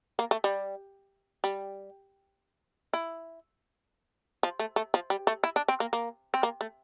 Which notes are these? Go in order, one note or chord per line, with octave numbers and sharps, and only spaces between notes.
A#3
A3
G3
G3
E4
F3
A3
A3
F3
G3
A3
E4
D4
C4
A#3
A#3
C4
A#3
A3